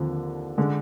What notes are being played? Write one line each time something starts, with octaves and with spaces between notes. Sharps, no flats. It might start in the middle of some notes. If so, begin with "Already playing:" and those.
Already playing: D#2 D3 F3 C4
D3 G#3